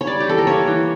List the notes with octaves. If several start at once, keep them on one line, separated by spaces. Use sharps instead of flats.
C#5
G3 D5
G4
E3 A4
A#4
A#3 C#5
E3